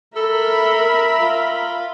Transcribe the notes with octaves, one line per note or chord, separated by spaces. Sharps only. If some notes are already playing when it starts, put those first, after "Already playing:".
A4 A#4 E5 B5
F4